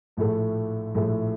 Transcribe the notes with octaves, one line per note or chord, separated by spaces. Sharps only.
A#1 A2 A3
A#1 A2 A3